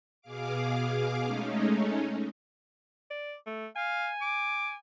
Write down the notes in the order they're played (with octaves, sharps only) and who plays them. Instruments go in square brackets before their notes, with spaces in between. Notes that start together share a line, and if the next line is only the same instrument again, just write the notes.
[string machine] B2 G#4 F5 D6
G#3 A3 C#4 D#4
[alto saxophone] D5
A3
[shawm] F5 [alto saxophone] G#5
[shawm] D6